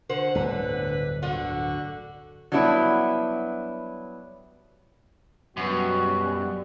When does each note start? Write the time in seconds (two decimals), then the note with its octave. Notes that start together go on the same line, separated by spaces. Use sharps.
0.09 D3 C5 F#5
0.35 D1 G1 D3 B4
1.23 D3 F#4
2.52 F#3 G3 B3 D4 E4
5.57 F#2 B2 G3 F#4